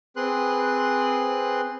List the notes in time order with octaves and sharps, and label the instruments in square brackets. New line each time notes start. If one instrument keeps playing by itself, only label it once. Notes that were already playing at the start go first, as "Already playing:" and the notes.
[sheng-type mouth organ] C4 G#4 B4 C6 F#6